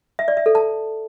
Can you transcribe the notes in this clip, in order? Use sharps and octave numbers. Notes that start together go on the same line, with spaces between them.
E5
D5
E5
A4
A5